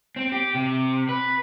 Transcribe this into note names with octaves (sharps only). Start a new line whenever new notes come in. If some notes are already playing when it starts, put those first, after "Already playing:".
C4
G4
C3
B4